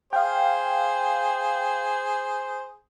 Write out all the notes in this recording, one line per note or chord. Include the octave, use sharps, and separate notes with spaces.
G#4 C5 F5 G5